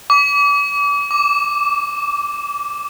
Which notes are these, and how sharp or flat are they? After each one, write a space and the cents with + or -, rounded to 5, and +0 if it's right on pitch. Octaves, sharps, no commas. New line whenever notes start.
D6 -35
D6 -5